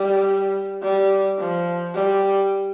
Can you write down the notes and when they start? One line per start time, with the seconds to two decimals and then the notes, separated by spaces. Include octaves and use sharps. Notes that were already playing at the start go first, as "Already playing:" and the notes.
Already playing: G3
0.83 G3
1.38 F3
1.94 G3